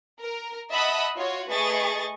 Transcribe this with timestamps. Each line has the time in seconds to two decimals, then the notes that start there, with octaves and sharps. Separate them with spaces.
0.20 A#4
0.71 D#5 E5 F#5 A5 B5 D#6
1.16 F4 F#4 C#5
1.49 A3 G#4 B4 D#5 C#6 A6